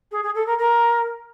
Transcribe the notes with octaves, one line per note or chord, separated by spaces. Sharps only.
G#4
G#4
A4
A#4
A#4